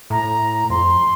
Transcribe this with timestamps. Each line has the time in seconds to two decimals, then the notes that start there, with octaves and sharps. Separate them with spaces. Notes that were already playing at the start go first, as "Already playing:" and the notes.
0.10 A2 A#5
0.70 F2 C6